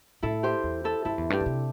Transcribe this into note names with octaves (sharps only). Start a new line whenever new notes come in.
A2 E4 A4
G4 C5
E2
E4 A4
G2 E4 A4
E2
G2 D4 G4
D3
C3